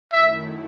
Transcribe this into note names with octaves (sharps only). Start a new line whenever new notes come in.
F#2 D#3 A3 E4 E5